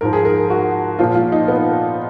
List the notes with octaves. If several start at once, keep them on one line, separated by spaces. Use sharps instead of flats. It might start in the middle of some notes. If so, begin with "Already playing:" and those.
G#2 F3 A#4
G#4
A#4
F#4
A#2 F3 F4
F4
D#4
B3